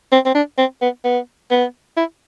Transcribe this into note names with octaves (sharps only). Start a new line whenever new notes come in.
C4
C4
D4
C4
B3
B3
B3
E4